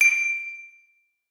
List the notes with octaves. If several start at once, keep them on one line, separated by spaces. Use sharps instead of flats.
D7